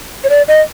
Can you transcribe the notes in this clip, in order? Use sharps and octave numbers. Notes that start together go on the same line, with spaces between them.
C#5
D5
D#5